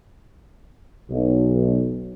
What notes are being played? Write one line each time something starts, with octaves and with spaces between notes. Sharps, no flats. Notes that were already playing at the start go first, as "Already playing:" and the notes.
B1